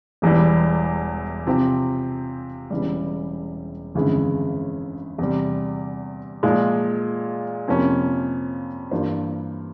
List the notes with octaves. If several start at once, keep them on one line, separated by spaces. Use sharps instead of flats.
E1 E2 E3 G3
C3 F3 C4 G4
E1 E2 C#3 E3 G3
G1 F2 C#3 E3 G#3
E2 C3 G3
A#2 F3 G#3
F2 C3 F3 A#3 C#4
G2 E3 A#3 F4 C5